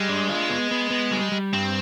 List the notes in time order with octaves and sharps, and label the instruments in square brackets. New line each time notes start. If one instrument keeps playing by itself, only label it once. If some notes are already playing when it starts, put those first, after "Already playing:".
Already playing: [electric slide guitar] G3 [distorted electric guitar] G#3
[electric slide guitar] D4
F4
B3
B3
B3
G3
G3
[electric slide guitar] G2 [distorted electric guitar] C4